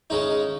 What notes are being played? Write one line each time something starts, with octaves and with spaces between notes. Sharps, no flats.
C#3 G#3 D#4